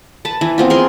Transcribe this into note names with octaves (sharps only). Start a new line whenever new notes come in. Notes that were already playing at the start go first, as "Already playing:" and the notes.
B4 A5
E3
B3 C4 F4
G#4 A#4 G#5 C6